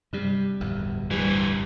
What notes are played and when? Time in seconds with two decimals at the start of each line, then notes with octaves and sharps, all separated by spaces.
0.13 G2 C3 G3
0.60 D1 G1 E2
1.11 G2 E3 G3